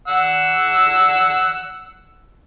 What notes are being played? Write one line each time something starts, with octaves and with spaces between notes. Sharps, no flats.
F#5 E6